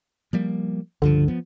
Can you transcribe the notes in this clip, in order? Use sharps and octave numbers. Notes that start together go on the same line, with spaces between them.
F3 G3 A#3
C#2 G2 D3 F3
F3 B3